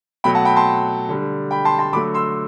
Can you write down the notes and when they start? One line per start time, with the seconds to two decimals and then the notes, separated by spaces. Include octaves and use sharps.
0.24 B2 F#3 A3 G5 B5
0.35 F#5 A5
0.45 G5 B5
0.56 A5 C6
1.09 D3 G3
1.51 G5 B5
1.65 A5 C6
1.79 A5 C6
1.93 D3 F#3 A3 B5 D6
2.14 C6 E6